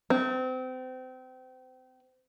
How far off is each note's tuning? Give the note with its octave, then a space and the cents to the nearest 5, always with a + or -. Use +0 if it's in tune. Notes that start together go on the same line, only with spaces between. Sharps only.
C4 -30